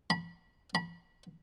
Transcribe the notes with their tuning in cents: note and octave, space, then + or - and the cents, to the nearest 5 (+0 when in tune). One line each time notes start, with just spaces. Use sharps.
B5 -25
B5 -30